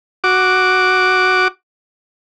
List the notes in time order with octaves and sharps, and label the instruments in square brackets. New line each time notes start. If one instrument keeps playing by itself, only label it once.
[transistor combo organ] F#4 D6